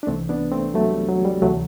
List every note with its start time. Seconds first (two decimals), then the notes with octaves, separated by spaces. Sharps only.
0.03 D4
0.07 C2 C3 E3 A3 C4
0.29 B3 D4
0.52 A3 C4
0.74 F#3 A3
0.91 G3
1.09 F#3
1.25 G3
1.42 D2 C3 E3 F#3 A3